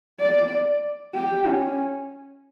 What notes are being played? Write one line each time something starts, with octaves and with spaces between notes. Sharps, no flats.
D5
G4
C#4